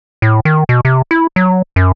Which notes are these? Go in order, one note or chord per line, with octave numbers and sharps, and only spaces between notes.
A2
D#3
B2
C3
E4
F#3
F#2